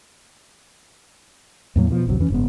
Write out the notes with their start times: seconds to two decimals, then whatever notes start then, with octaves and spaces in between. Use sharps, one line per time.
1.76 E2 A2 F#3 A#3
1.91 B2 F3
2.07 G#1 D2 C3 F#3
2.19 F2 E3 C#4
2.30 F#1 G#2 B3